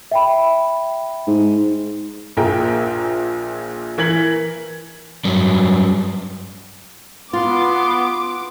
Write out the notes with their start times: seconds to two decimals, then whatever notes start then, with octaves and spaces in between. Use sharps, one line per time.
0.12 E5 G5 B5
1.27 G#2
2.37 A#1 A#2 G#4 A#4 G5 A#5
3.98 E3 A#4 G#6 B6 F#7
5.25 G2 F#3
7.33 B3 F4 C6 D6